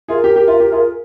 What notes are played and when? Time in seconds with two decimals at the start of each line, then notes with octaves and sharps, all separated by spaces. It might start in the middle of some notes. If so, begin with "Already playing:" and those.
0.08 F4 G#4 A#4
0.24 G4
0.36 G4
0.48 F4
0.60 G4
0.72 F4 G#4